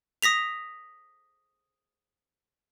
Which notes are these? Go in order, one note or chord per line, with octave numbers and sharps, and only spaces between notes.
D#6 A#6 B6 F7